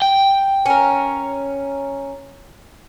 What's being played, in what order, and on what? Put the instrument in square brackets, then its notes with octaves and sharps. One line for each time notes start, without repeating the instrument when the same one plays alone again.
[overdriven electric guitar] G5
[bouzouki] C#4 A#4